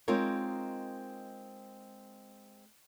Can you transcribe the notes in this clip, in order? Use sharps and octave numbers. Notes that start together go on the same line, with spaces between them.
G#3 C4 D#4 F4 A#4 C#5